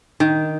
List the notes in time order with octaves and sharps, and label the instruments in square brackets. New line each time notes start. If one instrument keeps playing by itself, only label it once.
[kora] D#3